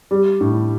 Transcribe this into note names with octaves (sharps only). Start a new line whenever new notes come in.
G3
A2